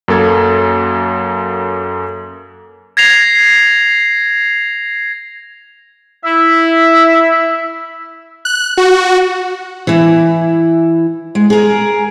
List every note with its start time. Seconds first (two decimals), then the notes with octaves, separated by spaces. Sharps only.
0.08 F#2 A#3 A4 G#6
2.97 G#6 A#6 C7 F7
6.25 E4 E5
8.45 F#6
8.77 F#4
9.87 E3 E4
11.35 G#3
11.50 G#4 A#4